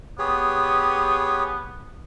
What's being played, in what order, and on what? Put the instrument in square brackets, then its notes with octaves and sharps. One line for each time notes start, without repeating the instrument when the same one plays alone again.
[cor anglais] B3 [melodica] G4 G#4 C#5